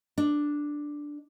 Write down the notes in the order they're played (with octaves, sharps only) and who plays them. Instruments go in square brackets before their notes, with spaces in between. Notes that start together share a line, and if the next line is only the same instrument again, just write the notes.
[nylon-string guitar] D4